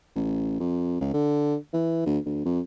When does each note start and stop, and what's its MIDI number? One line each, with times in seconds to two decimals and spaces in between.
0.15 0.58 33
0.60 1.00 41
1.01 1.09 37
1.14 1.55 50
1.73 2.05 52
2.06 2.18 38
2.26 2.41 38
2.45 2.60 41